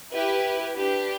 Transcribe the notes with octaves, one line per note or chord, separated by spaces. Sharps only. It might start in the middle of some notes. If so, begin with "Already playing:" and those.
E4 G4 B4
D4 G4 B4